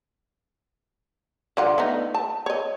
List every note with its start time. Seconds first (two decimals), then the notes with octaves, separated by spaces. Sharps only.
1.57 D3 F4 F#5
1.78 A3 B3 D#4
2.14 A5
2.46 C#5 D#5